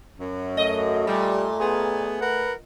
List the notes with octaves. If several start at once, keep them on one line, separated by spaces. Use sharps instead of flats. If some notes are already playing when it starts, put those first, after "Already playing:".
F#2
A3 D#5
A#2 G3
B3 G#4
A#4 B4 F#5